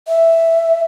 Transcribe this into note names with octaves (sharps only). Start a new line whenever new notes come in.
E5